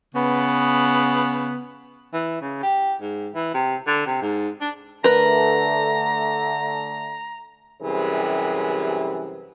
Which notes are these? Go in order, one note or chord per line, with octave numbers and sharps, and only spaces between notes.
C#3 B3
E3
C#3
G4
G#2
E3
C3
D3
C3
G#2
D4
D3 A3 A#4 B4 A#5
F#2 C3 E3 G3 G#4 C5